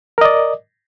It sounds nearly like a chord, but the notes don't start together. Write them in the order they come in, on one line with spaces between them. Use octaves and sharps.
A#4 D#5 D5